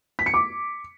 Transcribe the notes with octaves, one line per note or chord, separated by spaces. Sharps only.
B6
C#7
D6